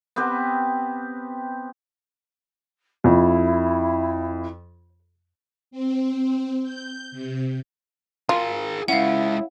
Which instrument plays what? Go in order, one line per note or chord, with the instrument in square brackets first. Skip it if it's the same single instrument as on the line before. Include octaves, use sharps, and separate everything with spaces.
[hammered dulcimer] B3 C4 G4 B4
[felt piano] F2 [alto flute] E4
[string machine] C4
G6
C3
[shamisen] F4 [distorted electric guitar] G#4 A#4
[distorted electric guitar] G#3 C#4 [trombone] E4 [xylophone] F5 F#5